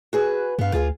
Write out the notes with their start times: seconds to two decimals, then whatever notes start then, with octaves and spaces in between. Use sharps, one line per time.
0.13 F#4 G#4 B4
0.59 G2 B3 F5
0.73 D2 F4 G#4 F5